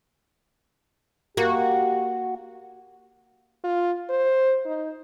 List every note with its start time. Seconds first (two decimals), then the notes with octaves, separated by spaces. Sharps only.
1.37 A#3 F#4 G4
3.64 F4
4.10 C5
4.66 D#4